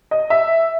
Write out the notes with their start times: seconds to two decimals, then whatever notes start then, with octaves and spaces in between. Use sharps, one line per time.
0.11 D#5
0.30 E5